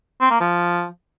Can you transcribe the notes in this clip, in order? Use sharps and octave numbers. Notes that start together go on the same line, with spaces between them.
C4
A#3
F3